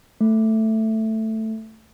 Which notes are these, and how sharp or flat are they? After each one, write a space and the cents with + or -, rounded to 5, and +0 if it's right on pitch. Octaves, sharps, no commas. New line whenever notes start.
A3 +5